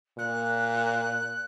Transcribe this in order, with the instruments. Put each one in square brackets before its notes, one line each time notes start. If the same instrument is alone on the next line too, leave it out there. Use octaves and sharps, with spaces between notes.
[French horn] A#2 [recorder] F#6